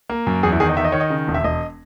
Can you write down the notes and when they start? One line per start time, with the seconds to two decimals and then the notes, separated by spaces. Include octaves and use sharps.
0.10 A#3
0.27 F#2
0.43 E2 G#4
0.52 E4
0.60 D#3 G#4
0.69 D#5
0.77 D#3 E5
0.85 D#5
0.92 D#3 C#5
1.00 D#5
1.10 C#3
1.28 E1
1.34 E5
1.44 E1 D#5